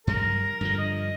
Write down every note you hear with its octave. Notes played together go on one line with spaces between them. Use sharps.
G2 F#3 G#3 A#4
G2 D3 F3
D#5